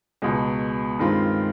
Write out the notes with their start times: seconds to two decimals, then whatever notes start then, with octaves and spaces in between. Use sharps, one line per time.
0.22 C#2 B2 G#3
0.99 G2 D#3 G#3 C4 F4